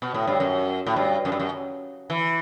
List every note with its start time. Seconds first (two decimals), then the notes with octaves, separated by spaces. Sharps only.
0.02 B2
0.14 A2
0.27 G2
0.40 F#2
0.86 A2
0.96 G2
1.25 F#2
1.32 G2
1.39 F#2
2.10 E3